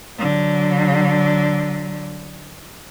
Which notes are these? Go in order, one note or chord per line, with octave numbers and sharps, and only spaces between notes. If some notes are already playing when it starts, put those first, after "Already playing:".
D3 F#3